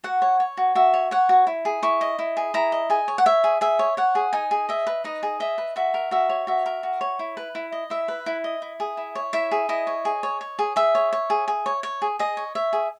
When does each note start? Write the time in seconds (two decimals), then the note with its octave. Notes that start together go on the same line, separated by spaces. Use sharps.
0.04 F#4 F#5
0.22 C#5
0.40 C#5
0.57 F#4
0.75 F#4 E5
0.94 C#5
1.11 C#5 F#5
1.29 F#4
1.47 E4
1.65 G#4
1.83 E4 C#6
2.01 D#5
2.19 E4
2.37 G#4
2.54 E4 A#5
2.72 D#5
2.90 G#4 G#5
3.08 C#5
3.18 F#5
3.26 C#5 E5
3.44 G#4
3.61 G#4 E5
3.79 C#5
3.97 C#5 F#5
4.15 G#4
4.33 D#4 G#5
4.51 G#4
4.69 D#5 E5
4.87 B4
5.04 D#4 D#5
5.23 G#4
5.40 D#5 E5
5.58 B4
5.76 F#4 E5
5.94 A#4
6.11 F#4 E5
6.29 C#5
6.47 F#4 E5
6.66 A#4
6.83 F#4
7.01 C#5
7.19 E4
7.37 B4
7.55 E4
7.72 D#5
7.90 E4 E5
8.08 B4
8.26 E4
8.44 D#5
8.62 E4
8.80 G#4
8.97 E4
9.15 C#5
9.33 E4 E5
9.51 G#4
9.69 E4 D#5
9.87 C#5
10.05 G#4
10.23 C#5
10.41 C#5
10.59 G#4
10.76 G#4 E5
10.95 C#5
11.13 C#5
11.30 G#4
11.48 G#4
11.66 C#5
11.83 C#5
12.02 G#4
12.19 G#4 D#5
12.37 C#5
12.55 C#5 E5
12.73 G#4